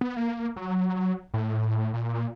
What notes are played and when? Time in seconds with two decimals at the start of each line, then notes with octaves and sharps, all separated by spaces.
0.01 B3
0.17 A#3
0.56 F#3
1.34 A2
1.94 A#2